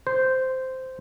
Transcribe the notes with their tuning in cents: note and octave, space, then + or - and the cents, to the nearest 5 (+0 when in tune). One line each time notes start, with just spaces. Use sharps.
C5 -10